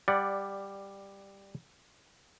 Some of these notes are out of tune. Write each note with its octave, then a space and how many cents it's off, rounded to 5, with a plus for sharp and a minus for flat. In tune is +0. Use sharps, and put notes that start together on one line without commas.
G3 +10 D5 +0 F#5 +0